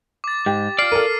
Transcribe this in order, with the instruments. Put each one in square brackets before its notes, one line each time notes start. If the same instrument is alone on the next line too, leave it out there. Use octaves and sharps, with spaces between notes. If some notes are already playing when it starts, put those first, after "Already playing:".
[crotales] D6 A6
[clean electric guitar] G#2 [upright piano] G4
[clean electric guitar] F4 D5 [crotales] F6 C7
[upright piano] A4 A#4 [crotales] D#7